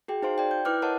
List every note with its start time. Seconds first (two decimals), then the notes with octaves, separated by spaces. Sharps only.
0.08 F#4 G#4 G5
0.22 D#4 F#4 C5 F5 C6 D7
0.38 D5 G5
0.51 G6
0.65 E4 B4 D6 F6 F#6
0.82 A#4 C#5 D#5 F#5 A5